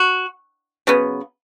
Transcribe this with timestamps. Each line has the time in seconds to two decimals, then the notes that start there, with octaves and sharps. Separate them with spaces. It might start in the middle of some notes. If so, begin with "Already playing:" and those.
Already playing: F#4
0.87 C#3 F#3 B3